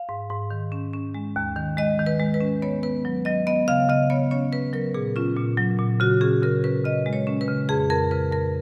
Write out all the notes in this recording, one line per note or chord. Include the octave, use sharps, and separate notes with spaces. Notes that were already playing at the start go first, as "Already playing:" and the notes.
Already playing: F5
G#2
G#2
D#3
C#4
C#4
G#3
D#2
D#3
G#3 D#5
D#3
B4
G#3
B4
C#4
B3 C#5
B3 B4
F#3
F#3 D#5
B3 D#5
C#3 F5
C#3 D#5
B3 C#5
C#4 C#5
C#4 B4
F#3 A#4
A#2 G#4
C#4 F4
A#2
F#3
A#2
C#3 F#4
C#4 G#4
C#3 A#4
C#4 B4
C#3 D#5
G#3
C#5
C#4
B4
C#3
F2 G#4
F2 A#4
C#3 B4
F2 A#4